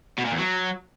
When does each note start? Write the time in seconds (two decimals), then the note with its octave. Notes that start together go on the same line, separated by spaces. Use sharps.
0.18 B2
0.25 A#2
0.32 E2
0.39 F#3